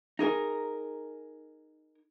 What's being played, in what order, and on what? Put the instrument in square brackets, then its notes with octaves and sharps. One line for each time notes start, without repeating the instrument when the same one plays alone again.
[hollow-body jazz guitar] D#4 G#4 A#4